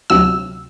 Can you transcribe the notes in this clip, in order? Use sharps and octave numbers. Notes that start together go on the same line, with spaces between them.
D2 C3 F#3 E6